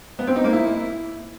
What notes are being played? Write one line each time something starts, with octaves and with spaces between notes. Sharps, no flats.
B3
C4
D#4
A#3
E4